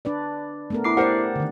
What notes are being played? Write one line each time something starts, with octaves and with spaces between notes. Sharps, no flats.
D4 B4 D5
A3 B3 A#4
E4 D6 C7
G4 A#4 C5 D5 F#5
D3 D#3